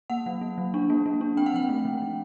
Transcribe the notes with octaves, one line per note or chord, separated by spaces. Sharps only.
A#3 F#5
F#3
A#3
F#3
D4
A#3
A#3
D4
C4 G5
F#5
F3 G5
A3
F3
F3